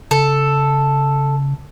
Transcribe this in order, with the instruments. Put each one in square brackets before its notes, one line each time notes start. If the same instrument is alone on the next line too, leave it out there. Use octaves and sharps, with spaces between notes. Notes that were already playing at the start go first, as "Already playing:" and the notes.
[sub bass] C#3 [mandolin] A4